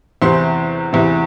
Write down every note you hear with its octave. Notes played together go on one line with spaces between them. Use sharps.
E2 C3 E3 C5 C6
E2 C3 E3